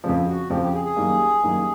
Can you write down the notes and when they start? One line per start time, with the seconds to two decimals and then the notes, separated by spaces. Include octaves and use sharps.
0.04 F2 C#3 F3
0.27 F#4
0.50 F2 C#3 F3 G4
0.62 G4
0.74 G#4
0.85 G#4
0.96 F#2 D#3 G3 A#3
1.43 F#2 D#3 G3 A#3